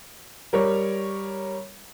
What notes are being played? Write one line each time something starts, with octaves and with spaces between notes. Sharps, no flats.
G3 A#4 C#5